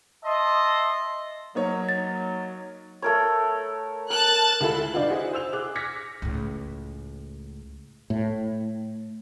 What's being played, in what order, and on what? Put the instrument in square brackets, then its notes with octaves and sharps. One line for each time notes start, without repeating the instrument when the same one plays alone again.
[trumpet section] D#5 E5 A5 C6
[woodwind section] F#3 [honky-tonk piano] A#3 D#4 C#5
[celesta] A6
[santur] A3 A#4 C#5
[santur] A#4 [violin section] A5 F#6
[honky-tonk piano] D2 G#3 E4 F4 A4 B5
G1 D4 D#4 F4 B4
E4 F#4 G#4 C5 D#5
C5 E6 F7
G#4 D6 F#6
D6 F6 G#6 A#6 B6 C#7
[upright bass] C#2 A2
[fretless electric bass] A2